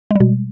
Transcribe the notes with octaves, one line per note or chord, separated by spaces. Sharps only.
B2 G3 G#3